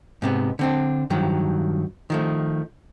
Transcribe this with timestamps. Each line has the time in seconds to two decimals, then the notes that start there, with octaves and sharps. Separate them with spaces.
0.22 G#2 C3 B3
0.59 D3 C4 D4
1.10 G2 D#3 F3 F#3
2.10 D#3 F3 A3